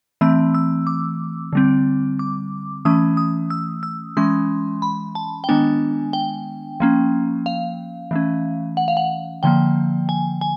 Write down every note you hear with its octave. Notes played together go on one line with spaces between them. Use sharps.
E3 A3 C4 E6
E6
D6
D3 G3 C4
D6
E3 A3 C#4 D#6
D#6
E6
E6
E3 G#3 C#4 C6
B5
A5
G5
D#3 G#3 B3 D4 G#5
G5
F3 A#3 C#4
F5
E3 A3 C#4
F#5
F5
F#5
D3 F3 A#3 G5
G#5
G#5